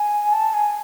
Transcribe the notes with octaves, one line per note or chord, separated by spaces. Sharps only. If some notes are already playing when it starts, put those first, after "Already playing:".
Already playing: G#5
A5
G#5